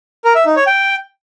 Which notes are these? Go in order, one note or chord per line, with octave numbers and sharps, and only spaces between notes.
A#4
E5
D#4
C#5
G5